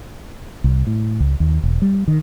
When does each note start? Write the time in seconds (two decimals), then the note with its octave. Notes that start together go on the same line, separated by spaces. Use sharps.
0.64 C2
0.87 A2
1.20 C#2
1.40 D#2
1.63 E1
1.82 G3
2.08 D#3